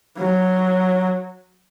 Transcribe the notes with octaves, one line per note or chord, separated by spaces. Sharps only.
F#3